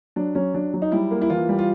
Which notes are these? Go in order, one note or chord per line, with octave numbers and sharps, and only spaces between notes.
F#3 D4
F#3 C#4
F#3 D4
F#3
D#4
G3 E4
A#3
E4
E3 F4
G3
F4